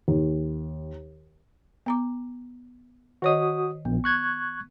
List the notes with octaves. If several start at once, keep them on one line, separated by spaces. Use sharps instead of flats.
D#2
B3 A#5 D6
D#3 F#4 C#5 D#5 D#6
A#1 B3
C#6 F#6 G#6